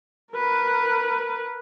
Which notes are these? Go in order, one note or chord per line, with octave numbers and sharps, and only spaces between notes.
A#4 B4